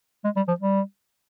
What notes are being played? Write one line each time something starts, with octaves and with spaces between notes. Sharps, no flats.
G#3
G3
F3
G3